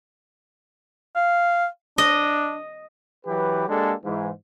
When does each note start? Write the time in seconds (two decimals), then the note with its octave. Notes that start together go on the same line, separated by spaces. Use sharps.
1.16 F5
1.98 D4 D#5
3.26 E3 F#3 G4 B4
3.69 G#3 A#3 D4 G4 A4
4.04 G#2 E3